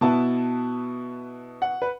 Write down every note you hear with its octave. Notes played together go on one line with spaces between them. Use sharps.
B2 B3 E4 A5
F#5
B4